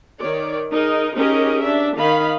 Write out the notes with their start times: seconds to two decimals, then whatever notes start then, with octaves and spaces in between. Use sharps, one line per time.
0.20 D#3 C#5 D5
0.70 D#4 G#4 A#4 D#5
1.14 C#4 D#4 G4 G#4 A#4 D#5
1.60 D4 E5
1.97 D#3 D#5 F5 B5